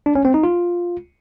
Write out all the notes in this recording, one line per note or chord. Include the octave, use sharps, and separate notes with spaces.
D4
C#4
C4
D#4
F4